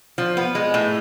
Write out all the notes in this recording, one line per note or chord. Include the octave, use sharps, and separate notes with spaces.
F3
B3
G#3
A2